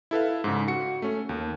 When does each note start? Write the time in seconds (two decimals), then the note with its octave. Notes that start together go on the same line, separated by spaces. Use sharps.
0.11 E4 A4 B4 F5
0.44 G#2 C#3
0.68 F#4 C#7
1.02 A3 C#4
1.29 D#2